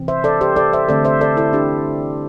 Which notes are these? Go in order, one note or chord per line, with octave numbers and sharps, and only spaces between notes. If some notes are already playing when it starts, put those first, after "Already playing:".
Already playing: C3 E3 C4
C5 E5
A4 D5
G4 C5
A4 D5
C5 E5
D3 A3 C4 A4 D5
C5 E5
A4 D5
E4 A4
D4 G4